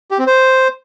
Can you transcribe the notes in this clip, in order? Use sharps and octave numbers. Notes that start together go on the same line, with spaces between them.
G4
C4
C5